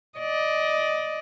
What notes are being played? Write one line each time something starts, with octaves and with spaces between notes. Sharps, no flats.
D5 D#5